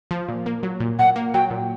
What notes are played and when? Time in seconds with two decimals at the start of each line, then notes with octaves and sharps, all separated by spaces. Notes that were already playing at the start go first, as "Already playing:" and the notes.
0.11 F3
0.28 A#2
0.46 A#3
0.63 F#3
0.80 A#2
0.99 A#2 F#5
1.16 A#3
1.34 F#3 G5
1.50 A#2